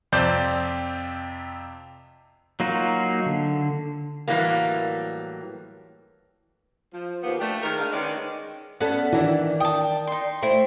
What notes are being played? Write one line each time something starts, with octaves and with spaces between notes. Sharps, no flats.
F2 C3 C4 D5 G6
F#3 A#3 D#4 F4 F#4
D3
A2 E3 F#3 G3 A#3
F3
D#2 A#3 B3 F4 C5
A3 D4 G4
D#3 G#3 A#4
D3 G#3 F5
D#3 G#3 C#4 B4 D5
B3 C#4 A4 D5 F#5
D#3 E3 D4 E4
G5 A5 D#6
D#4 C6
A3 E4 C5 C6